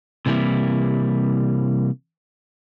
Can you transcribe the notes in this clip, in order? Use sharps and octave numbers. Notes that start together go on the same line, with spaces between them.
C3 E3 G3 A#3 E4